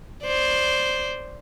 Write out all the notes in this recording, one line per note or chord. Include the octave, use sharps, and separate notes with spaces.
C5 D5